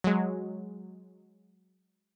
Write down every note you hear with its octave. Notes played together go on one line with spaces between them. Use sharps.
F#3 G#3